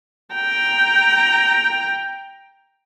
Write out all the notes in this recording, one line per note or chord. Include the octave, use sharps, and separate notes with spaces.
G5 A#5